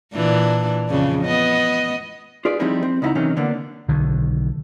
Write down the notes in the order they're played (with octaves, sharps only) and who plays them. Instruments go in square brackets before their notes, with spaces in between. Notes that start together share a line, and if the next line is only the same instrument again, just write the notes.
[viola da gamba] A#2 E3 D4
F2 C#3 D4
B3 D#5
[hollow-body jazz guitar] F4 G#4 B4 D5
F3 G3 C4 D#4 E4 G#4
C4
C#2 D#4 E4 D#5 F#5 A#5
C3 D#3 E3 F#3 C#4 D#4
D3 A#3 B3 D4
[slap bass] B1 D3 D#3